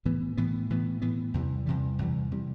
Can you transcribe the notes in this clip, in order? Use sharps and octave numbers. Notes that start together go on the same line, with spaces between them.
A2 E3 B3
A2 E3 B3
A2 E3 B3
A2 E3 B3
E2 C3 E3 G3
E2 C3 E3 G3
E2 C3 E3 G3
C3 E3 G3